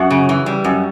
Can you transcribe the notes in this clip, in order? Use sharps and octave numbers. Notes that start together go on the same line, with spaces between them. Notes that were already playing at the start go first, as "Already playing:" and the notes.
Already playing: F#2 F#4 F#5
C#3
E3
G3
F#2